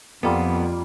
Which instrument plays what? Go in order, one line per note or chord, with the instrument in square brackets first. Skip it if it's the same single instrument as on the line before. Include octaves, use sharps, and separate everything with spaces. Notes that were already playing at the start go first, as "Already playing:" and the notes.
[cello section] F2 [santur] G3 A#3 F4 [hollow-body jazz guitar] B3 A4